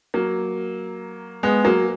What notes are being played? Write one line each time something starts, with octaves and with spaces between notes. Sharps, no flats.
F#3 A#3
G#3 B3
F#3 A#3